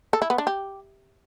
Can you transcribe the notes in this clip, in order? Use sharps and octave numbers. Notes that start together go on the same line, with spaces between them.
A4
E4
B3
D4
G4